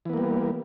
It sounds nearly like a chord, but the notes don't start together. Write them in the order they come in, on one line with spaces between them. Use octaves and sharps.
E3 B3 A#3 G3